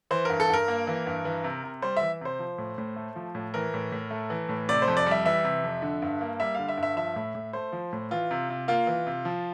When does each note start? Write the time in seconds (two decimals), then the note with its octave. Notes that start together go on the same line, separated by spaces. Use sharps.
0.11 E3 C5
0.25 G2 A#4
0.40 A4
0.50 G2 A#4
0.68 A#3
0.87 E3
1.07 G2
1.25 E3
1.44 C3
1.64 C3
1.82 G3 C5
1.97 E3 E5
2.21 C3 C5
2.39 F3
2.58 A2
2.78 A2
2.96 A3
3.16 F3
3.35 A2
3.54 E3 A#4
3.74 A2
3.92 A2
4.11 A3
4.30 E3
4.49 A2
4.69 C3 D5
4.82 C5
4.87 F2
4.97 D5
5.06 G3 E5
5.25 E3 E5
5.44 C3
5.64 F2
5.82 D3
6.02 G2
6.21 A#3
6.40 G3 E5
6.55 D3 F5
6.69 E5
6.78 G2
6.83 E5
6.96 F3 E5
7.16 A2
7.35 A2
7.53 A3 C5
7.72 F3
7.93 A2
8.11 E3 F4
8.31 C3
8.50 C3
8.68 A#3 F4
8.87 E3
9.06 C3
9.25 F3